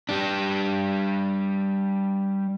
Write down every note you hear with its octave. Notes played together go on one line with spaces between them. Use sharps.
G3 D4